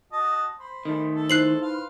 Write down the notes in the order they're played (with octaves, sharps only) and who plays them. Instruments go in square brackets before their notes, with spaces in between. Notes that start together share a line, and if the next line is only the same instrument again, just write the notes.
[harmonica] F#4 D#5 A5
C5 B5
[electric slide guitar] D#3 A3
[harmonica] A4
[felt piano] D#4 E4 C5 [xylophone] F#6 C7 F#7
[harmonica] B4 F5 C6